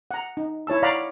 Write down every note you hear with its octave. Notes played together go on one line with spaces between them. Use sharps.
F#5 A#5
D#4
E4 C#5 A5 E6
D5 F5 F#5 A#5 B5 C#6